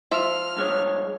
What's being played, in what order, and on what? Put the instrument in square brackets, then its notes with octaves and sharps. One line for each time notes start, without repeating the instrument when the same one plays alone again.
[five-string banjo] F3 E5 [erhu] F6
[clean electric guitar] G2 G#3 C#5